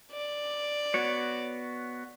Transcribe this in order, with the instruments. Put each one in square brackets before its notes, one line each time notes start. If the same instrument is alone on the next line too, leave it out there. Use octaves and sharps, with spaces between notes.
[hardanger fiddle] D5
[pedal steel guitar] B3 F#4 C#5